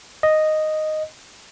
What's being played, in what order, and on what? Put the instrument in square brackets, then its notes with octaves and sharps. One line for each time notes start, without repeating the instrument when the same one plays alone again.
[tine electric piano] D#5